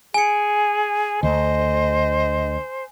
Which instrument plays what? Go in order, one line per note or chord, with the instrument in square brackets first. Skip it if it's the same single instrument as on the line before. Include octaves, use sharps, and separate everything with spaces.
[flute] G#4 [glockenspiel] G#5 C#7
[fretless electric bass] D2 [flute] C5 [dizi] D#5